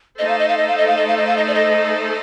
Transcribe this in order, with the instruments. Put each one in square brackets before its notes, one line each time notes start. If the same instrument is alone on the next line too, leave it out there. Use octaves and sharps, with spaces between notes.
[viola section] A3 D#4 A4 C5 [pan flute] D#5
[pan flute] F5
D#5
F5
D#5
F5
D#5
F5
D#5
F5
D#5
F5
D#5
D5
D#5